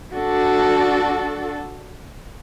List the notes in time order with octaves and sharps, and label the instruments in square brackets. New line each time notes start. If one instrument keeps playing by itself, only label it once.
[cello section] D4 F#4 A4